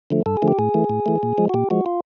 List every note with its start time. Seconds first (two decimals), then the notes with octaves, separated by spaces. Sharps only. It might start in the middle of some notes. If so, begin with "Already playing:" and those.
0.11 D3 F3 A3
0.26 G2 A4
0.37 G#4
0.42 D3 F3 A3
0.48 G4
0.59 A2 G#4
0.74 E3 A3
0.90 A2
1.06 E3 A3
1.23 A#2
1.38 F3 G#3
1.49 F#4
1.54 A#2 G4
1.70 F3 G#3 F#4
1.86 F4